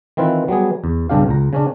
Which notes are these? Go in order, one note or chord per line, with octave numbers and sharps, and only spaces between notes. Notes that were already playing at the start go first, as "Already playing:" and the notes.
D#3 E3 C4 E4 F4 B4
F#3 G3 B3 G#4
E2
B1 G2 C#3 D4 G4 F5
C#2 A#5
C#3 C#4 D4